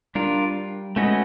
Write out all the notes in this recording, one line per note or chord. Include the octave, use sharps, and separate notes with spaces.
G3 D4 F4 A#4
G#3 A3 C#4 F#4 B4 D#5